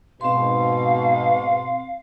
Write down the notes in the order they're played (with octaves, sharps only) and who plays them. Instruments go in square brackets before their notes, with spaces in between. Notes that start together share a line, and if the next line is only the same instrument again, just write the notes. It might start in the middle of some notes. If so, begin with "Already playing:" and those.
[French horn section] G#2 B2 [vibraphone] C4 C6 [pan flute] F5